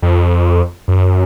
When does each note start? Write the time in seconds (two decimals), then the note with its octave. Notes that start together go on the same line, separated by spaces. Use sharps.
0.02 F2
0.88 F#2